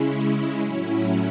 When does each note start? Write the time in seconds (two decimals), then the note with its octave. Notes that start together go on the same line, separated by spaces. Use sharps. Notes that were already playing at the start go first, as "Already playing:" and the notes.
Already playing: C#3 G#3 C#4 E4
0.62 A2 F#3 C#4 E4